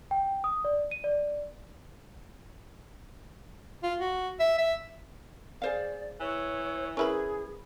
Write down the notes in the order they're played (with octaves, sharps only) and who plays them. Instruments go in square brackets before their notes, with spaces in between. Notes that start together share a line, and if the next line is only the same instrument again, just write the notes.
[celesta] G5
D#6
D5
D#7
D5
[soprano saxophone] F4
F#4
E5
E5
[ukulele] G#4 C5 F5 [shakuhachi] D5
[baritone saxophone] E3 [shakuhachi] C#5
[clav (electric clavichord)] C#4 E4 [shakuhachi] G#4 [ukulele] A#4 B4 B5